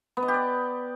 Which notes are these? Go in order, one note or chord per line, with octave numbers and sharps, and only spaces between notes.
B3
D#5
G4
D5